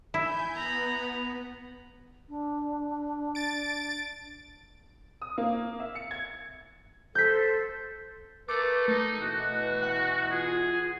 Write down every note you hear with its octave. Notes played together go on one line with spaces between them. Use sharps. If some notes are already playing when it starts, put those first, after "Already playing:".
E4 G#5 G6
B3 A#5 B5
D4
A6 D7
D#6
A#3
E5
C#7
G#6
A4 C5 G6 B6
A3 A#4 B4 D6
A3 D#4
B2 E3 F#4 F#6
F#5
F4 G#4